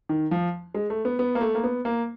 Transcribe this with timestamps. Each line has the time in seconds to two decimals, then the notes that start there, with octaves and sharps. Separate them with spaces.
0.09 D#3
0.31 F3
0.74 G#3
0.90 A3
1.05 B3
1.19 B3
1.35 A#3
1.41 A3
1.55 A#3
1.64 B3
1.85 A#3